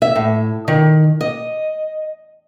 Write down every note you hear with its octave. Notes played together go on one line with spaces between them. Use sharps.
E5
A2
D#3
D#5